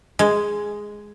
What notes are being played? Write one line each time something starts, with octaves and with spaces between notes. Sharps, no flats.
G#3